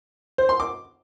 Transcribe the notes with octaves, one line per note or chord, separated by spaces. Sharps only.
C5
C6
D6